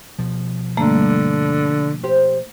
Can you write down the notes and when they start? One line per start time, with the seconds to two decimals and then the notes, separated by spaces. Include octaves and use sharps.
0.19 B2 F3
0.77 G2 D3 A3 A#3
2.04 G4 C5